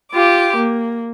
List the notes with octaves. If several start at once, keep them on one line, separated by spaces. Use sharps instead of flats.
F4 G4 D6
A#3